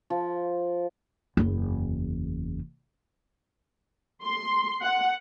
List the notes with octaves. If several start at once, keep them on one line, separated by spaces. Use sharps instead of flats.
F3
F#1 E2
C6
F#5